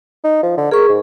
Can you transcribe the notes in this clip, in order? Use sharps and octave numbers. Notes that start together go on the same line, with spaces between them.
D#4
F3
D3
G#4 A#4 C#6
G#2